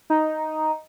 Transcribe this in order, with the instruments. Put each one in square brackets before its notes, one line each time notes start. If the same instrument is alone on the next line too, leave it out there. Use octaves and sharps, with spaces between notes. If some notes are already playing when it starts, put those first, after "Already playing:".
[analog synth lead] D#4